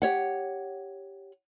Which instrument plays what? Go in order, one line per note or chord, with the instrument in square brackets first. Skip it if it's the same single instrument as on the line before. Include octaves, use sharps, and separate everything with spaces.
[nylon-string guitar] G4 C#5 F#5